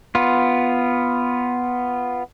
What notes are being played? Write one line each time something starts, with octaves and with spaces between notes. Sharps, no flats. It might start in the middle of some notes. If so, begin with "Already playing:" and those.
B3 F4